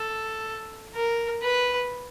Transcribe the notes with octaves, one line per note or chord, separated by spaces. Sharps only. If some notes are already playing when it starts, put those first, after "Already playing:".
Already playing: A4
A#4
B4